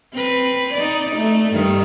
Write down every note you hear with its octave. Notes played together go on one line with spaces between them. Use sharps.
C4 B4
D#4 D5
A3
G2 D#3